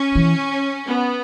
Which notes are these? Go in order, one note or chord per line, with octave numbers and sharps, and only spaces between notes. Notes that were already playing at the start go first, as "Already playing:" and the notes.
Already playing: C#4
E3
B3